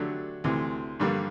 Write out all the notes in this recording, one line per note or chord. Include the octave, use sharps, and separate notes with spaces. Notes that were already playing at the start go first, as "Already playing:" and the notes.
Already playing: D3 F#3 A3 D4 G4
D2 C3 E3
G2 D3 G3 A#3